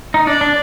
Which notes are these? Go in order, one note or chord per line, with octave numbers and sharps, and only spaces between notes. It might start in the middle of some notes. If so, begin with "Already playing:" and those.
D#4
D4 D5
D4